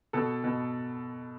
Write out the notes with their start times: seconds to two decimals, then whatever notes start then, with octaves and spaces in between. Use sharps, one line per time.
0.13 B2 A4
0.44 B2